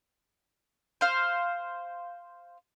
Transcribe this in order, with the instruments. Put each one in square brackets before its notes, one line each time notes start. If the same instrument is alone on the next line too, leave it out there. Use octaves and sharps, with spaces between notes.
[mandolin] C5 F5